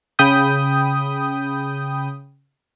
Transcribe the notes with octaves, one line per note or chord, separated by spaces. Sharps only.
C#3 G5 B5 D#6 G6